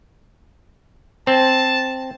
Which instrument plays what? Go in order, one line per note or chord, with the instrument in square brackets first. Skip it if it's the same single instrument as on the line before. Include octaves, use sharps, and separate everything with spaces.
[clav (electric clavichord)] C4 [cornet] A5